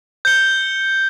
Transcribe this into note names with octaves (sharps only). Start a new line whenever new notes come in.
G6 C#7 G7